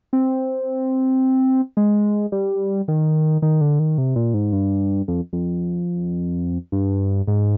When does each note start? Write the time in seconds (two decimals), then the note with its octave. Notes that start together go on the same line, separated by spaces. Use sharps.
0.13 C4
1.77 G#3
2.32 G3
2.88 D#3
3.42 D#3
3.61 D3
3.79 D#3
3.98 C3
4.16 A#2
4.34 G#2
4.53 G2
5.08 F2
5.33 F2
6.72 G2
7.27 G#2